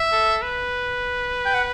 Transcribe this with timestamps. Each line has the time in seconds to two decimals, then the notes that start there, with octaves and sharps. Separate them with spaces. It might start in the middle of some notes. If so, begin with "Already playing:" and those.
Already playing: E5
0.12 A4
0.42 B4
1.45 G5
1.54 F#5